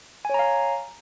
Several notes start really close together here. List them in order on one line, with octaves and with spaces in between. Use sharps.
G#5 C#5 A#5 F5